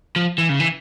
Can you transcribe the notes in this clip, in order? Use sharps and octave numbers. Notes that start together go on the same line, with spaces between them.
F3
E3
C#3
E3